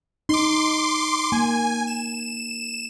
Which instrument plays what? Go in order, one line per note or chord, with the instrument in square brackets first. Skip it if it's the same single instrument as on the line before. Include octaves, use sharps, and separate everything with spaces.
[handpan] D#4 [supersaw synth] C6 D6
[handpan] A#3 [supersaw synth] G#5
[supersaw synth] E7